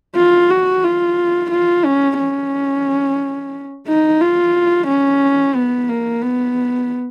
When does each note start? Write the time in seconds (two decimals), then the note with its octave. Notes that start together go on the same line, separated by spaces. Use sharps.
0.16 F4
0.50 F#4
0.84 F4
1.51 F4
1.85 C#4
2.19 C#4
3.87 D#4
4.21 F4
4.87 C#4
5.55 B3
5.89 A#3
6.22 B3